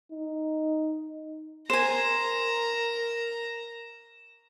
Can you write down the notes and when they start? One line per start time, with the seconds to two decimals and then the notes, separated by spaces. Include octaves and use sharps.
0.12 D#4
1.70 A#4 C5 G#5 A#5 E7